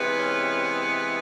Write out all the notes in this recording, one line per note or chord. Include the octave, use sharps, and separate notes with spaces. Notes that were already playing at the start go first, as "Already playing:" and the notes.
Already playing: C3 E3 G#3 B3
C#4